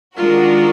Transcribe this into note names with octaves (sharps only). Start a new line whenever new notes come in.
D#3 G#3 D4 F4 F#4 A#4